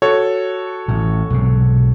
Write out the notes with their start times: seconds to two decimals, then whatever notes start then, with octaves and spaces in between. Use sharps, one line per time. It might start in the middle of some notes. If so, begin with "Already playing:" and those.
0.02 F#4 A4 C#5
0.88 A1 A2
1.30 B1 G#2 C3